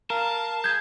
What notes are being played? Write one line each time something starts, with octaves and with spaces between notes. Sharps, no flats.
A#4 F5 A5
G#4 G6 G#6